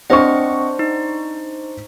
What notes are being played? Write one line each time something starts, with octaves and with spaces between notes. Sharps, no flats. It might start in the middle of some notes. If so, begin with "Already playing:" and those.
C4 D4 C5 D#5 F#5 C#6
D#4